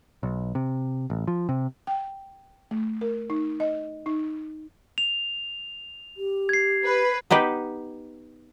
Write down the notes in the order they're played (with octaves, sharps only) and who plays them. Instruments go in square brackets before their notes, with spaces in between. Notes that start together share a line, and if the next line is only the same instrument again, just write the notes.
[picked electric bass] B1
C3
A1
F3
C3
[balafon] G5
A3
A#4
D#4
D#5
D#4
[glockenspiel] F7
[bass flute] G4
[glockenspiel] G#6 C7
[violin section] B4
[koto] B3 D#4 G4 B4